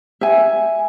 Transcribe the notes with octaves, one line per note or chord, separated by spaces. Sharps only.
E5 G#5